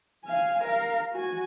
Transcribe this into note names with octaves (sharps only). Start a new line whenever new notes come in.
F5 G#5
A#4 F5
F#4 G#5